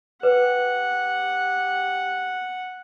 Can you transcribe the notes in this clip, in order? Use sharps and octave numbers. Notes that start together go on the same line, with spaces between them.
G4 B4 F#5